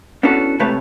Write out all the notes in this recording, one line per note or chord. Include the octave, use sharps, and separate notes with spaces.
B3 C#4 D4 E4 F#4 A4
C3 G#3 A3 B4 C#5 A5